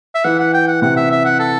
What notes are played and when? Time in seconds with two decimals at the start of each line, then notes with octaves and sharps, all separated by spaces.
0.15 E5
0.24 E3 F#5
0.40 F#5
0.54 G5
0.68 F#5
0.82 C3 F#5
0.97 E5
1.11 E5
1.25 F#5
1.39 A4